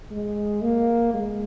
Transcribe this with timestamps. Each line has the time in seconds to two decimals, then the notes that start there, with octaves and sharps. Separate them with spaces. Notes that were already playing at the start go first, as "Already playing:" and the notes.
0.11 G#3
0.62 A#3
1.14 G#3